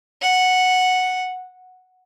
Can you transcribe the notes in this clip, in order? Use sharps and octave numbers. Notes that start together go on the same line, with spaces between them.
F#5